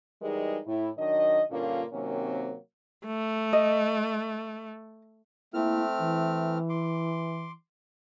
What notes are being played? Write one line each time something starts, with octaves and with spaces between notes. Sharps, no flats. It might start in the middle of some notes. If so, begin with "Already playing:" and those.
E3 G3 G#3 D#4 G#4 A#4
A2 E4
D#3 F#3 D4 D#5
G2 A#2 D3 A#3 C#4 F4
C3 D#3 F#3 A#3 C4 C#4
A3
D#5
A3 A#3 C4 E4 F6
E3
C6 D6